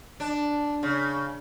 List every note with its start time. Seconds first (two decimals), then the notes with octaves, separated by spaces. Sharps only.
0.20 D4
0.83 C#3